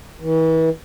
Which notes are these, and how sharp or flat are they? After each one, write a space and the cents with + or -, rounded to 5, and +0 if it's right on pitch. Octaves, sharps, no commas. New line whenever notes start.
E3 -35